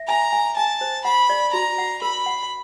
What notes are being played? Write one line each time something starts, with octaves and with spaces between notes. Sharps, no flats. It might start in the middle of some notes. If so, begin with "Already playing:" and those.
Already playing: E5
G#5 A#5
G#5
G#5 A5
C5
F#5 B5
D5
F#4 A#5
F#5
A#4 B5
F#5